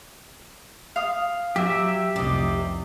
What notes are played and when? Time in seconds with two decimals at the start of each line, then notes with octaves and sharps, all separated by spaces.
0.96 F5 D#6
1.56 F#3 G4 E5
2.16 F1 C2 C3 D5 D#5